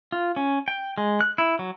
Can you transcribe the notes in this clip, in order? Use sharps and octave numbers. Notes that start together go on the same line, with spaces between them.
F4
C#4
G5
G#3
F#6
E4
F#3